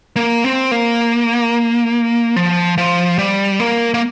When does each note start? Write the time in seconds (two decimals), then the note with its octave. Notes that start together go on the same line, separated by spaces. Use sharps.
0.16 A#3
0.44 C4
0.71 A#3
2.36 F3
2.78 F3
3.18 G3
3.60 A#3
3.94 A#3